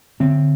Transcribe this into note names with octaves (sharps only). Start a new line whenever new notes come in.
D3 C4